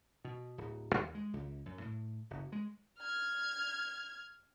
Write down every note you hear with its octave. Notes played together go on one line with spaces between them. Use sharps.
B2
D1
D#2
G#3
C#2
F#2
A2
F#1
G#3
F6 G#6